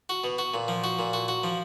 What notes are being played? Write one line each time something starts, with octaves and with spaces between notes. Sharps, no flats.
F#4
B2
F#4
A#2
F3
F#4
A#2
F#4
F#4
F3